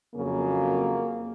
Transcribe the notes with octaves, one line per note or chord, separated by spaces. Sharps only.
F2 C#3 F#3 A#3